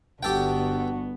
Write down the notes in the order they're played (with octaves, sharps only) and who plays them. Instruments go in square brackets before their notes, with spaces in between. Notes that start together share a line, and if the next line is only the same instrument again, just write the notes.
[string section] G1 B3 [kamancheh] D4 F#4 [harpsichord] G4 A4 G5